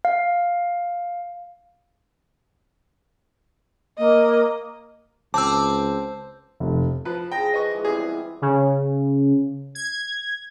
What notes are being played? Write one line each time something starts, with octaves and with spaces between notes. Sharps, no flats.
F5
A#3 D#5
C#2 C4 A5 D6 E6
F1
F3 B4 A5
F3 G#4 G5 A5 A#6
B4 D#5 C#6
E3 G#3
B2 G3 C4 G#4
C#3
G#6